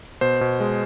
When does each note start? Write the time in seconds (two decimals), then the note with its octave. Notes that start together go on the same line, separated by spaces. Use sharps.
0.21 B2 C5
0.41 B2
0.60 G#3